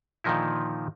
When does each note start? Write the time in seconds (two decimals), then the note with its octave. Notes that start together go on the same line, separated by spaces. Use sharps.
0.24 A#2 D3 D#3 F3 D#4 E4